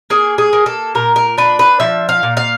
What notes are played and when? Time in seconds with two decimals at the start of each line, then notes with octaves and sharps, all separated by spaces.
0.10 A#3 G#4
0.38 G#4
0.53 A#3
0.66 A4
0.95 A#2 A#4
1.16 A#4
1.38 D4 B4
1.59 B4
1.80 F3 E5
2.09 F5
2.23 A#2
2.37 F5